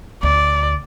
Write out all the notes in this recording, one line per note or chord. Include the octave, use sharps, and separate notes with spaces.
D2 D5